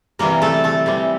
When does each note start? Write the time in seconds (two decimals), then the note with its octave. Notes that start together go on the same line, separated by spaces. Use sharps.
0.19 C3 E3 G3 A#3 A#4
0.42 A3 A4
0.64 A3 A4
0.86 C3 E3 G3